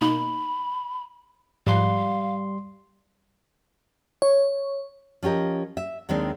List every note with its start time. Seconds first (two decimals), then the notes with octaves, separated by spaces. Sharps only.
0.01 B2 A#3 D#4 B5
1.67 G#2 F3 G3 F5 C6 F#6
4.22 C#5
5.23 F3 C#4 G4 A#4 D#5
5.77 E5
6.09 D#2 D#3 G#3 C4 D4